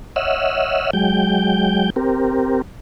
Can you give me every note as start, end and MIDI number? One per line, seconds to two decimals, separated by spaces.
0.16 0.90 73
0.16 0.90 75
0.16 0.90 76
0.16 0.90 78
0.16 0.90 88
0.16 0.90 89
0.93 1.90 54
0.93 1.90 56
0.93 1.90 79
0.93 1.90 91
1.96 2.62 60
1.96 2.62 67
1.96 2.62 70